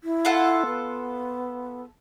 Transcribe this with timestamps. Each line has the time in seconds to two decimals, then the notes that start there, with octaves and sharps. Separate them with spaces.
0.04 E4
0.25 F4 A4 F#5
0.66 B3